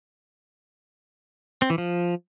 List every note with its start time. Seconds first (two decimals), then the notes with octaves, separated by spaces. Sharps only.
1.62 C4
1.70 E3
1.78 F3